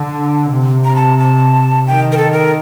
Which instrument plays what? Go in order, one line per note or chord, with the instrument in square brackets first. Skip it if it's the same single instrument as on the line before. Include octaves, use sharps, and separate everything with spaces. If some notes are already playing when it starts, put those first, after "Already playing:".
Already playing: [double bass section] D3
C3
[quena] A#5
A5
A5
[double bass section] D#3 [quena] G5
[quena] A#4
A4
A#4